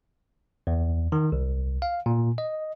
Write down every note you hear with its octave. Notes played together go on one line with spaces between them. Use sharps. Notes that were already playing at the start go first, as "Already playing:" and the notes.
E2
D#3
C2
F5
A#2
D#5